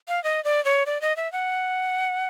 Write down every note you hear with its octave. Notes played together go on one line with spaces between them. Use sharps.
F5
D#5
D5
C#5
D5
D#5
E5
F#5